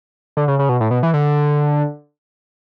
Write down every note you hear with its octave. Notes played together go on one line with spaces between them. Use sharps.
D3
C#3
C#3
B2
A2
B2
E3
D3